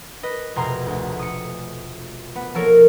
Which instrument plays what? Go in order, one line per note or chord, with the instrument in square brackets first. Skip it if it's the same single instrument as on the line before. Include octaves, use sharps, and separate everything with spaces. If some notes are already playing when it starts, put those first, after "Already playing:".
[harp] B4 D#5
F1 B2 G#4 A#5 C6
D2
D#6 C#7
B3
F3 A#3 A4 A#4 C#5